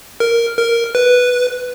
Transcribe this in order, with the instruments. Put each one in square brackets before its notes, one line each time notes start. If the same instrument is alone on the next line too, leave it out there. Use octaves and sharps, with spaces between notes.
[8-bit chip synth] A#4
A#4
B4